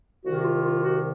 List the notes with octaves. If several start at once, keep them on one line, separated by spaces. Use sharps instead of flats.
C2 C3 D#3 F#4
F4
F4
F#4